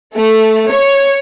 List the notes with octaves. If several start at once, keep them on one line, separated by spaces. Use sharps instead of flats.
A3
C#5